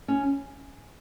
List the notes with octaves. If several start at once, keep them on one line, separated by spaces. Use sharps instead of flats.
C#4
G#5